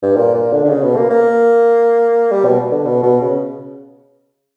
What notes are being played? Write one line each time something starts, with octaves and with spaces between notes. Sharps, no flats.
G2
A#2
A#2
D3
D3
C#3
B2
A#3
A#3
G3
B2
D3
B2
B2
C#3